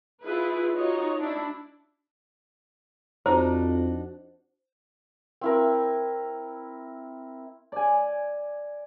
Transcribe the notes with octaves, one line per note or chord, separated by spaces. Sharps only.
E4 F4 G#4 B4
D#4 F4 F#4 C#5 D#5
D4 E4
F2 D4 D#4 F#4 C5 A#5
C4 E4 A#4
D5 G#5